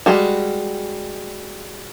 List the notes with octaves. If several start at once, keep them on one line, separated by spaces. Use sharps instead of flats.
G3 G#3 F#4